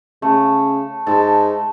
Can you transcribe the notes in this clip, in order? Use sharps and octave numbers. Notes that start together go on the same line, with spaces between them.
C#3 A3
G#2 A4